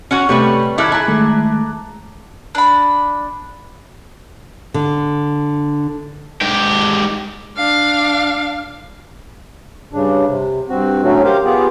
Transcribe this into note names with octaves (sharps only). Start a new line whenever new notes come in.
C#4 F#4 C#5
C3 G3 A3 G4 B4 C#5
D#3 E4 A4 D6 F#6 G#6
E4 G#4 A5 A#5
D#3 G#3 A3
D4 B5
D3
G#2 G4
D4 F5
G2 C#3 D4
C3
G2 C4 F#4
A2 D3 F#3 A3 C#4 F#4
G4 A#4 C5 F5
B3 F4 G4 G#4